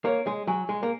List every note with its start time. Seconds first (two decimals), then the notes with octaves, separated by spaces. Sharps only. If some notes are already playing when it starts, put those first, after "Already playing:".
0.05 A#3 C#5
0.27 G#3
0.47 F#3 G#5
0.69 G#3
0.83 A#3